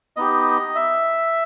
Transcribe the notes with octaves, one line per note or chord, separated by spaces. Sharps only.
B3 D#4 G4 D#5
E5